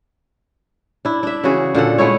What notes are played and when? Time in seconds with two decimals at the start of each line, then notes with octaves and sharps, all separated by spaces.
1.05 D4 E4
1.23 D4 E5
1.44 C#3 E3 F#4 G#4
1.75 A#2 D3 A4 F#5
1.98 G#3 A3 E4 C#5